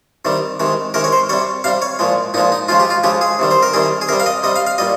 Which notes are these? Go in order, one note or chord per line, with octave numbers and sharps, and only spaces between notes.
C3 D#3 G3
C3 D#3 G#3
C3 D#3 G#3 A#4
C#5
C5
C3 G3 C#5
C3 G3 F5
C#5
A#2 F3 G#3
A#2 F3 G#3 D#4
D#4
C#3 F3 G#3 F4
G4
F4
C#3 F3 G#3 G4
G#4
C3 D#3 G3
C5
A#4
C3 D#3 G3 G#4
G#4
C3 G3 A#4
F5
D#5
C3 G3 D#5
F5
F5
A#2 G3 D#5